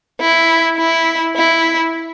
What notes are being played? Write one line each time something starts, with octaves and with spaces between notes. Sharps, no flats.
E4
E4
E4